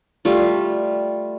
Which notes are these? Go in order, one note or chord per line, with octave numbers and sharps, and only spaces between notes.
G3 A3 F4